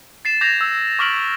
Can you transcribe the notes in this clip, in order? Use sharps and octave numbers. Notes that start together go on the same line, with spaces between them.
A6 C7 E7
D6 G6 G#6 A#6 C7 F7
E6
C#6 D6 F6 B6 D7 F#7